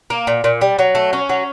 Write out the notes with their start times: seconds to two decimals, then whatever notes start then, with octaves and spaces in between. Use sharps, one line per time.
0.10 A#3
0.27 A#2
0.44 A#2
0.61 G3
0.79 F#3
0.95 A3
1.13 C#4
1.29 F#3